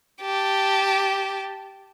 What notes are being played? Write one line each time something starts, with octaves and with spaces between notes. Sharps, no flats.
G4 A5